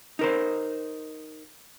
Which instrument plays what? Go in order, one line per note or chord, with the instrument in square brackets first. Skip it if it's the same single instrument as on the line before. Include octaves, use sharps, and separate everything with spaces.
[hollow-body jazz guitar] D#4 A#4 C5